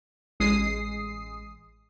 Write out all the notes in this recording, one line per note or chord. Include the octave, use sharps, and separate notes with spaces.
A1 G#3 D#6 C7